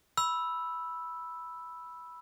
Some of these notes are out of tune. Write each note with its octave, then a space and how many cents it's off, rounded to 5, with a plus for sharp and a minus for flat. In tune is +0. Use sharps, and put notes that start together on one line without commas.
B5 -5 E6 +0